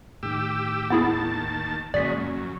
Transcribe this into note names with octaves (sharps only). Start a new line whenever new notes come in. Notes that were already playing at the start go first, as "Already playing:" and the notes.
A2 D#3 G4 E6
D#2 B3 E4 G#4 A5
F2 A#2 C#3 F#3 G#3 D5 B6
F#2